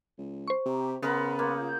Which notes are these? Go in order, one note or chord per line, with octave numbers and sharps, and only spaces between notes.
C#2
C5 C#6
C3 G4 A#5
C#3 B3 A#4 F#5 B5 C6
A#3
F4 G6